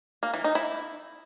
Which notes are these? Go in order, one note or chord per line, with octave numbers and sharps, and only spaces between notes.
A#3
E3
D#4
E4